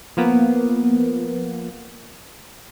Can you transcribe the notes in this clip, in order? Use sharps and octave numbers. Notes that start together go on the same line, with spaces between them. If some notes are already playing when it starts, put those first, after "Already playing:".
F3 A#3 B3